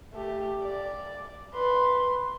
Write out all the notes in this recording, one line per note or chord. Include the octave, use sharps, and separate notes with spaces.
A3 G4
D5
B4 C6